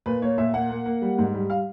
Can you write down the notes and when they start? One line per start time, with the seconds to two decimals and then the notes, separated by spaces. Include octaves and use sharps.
0.06 A#2 B4
0.22 A#3 C#5
0.38 A#2 E5
0.54 A#3 F#5
0.70 A#3
0.86 A#3
1.02 G3
1.18 G#2
1.34 G3
1.50 F5